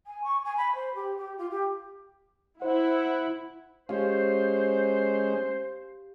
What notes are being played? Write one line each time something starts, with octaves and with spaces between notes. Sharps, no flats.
G#5
C#6
G#5
B5
C5
G4
G4
F4
G4
E4 C5 F#5
G#3 C#4 G4 C5 F5